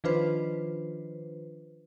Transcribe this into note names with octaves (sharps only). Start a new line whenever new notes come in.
D#3 F3 D4 F4 B4 C5